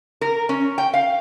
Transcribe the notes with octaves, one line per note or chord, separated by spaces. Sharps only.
A#4
C#4
G5
F5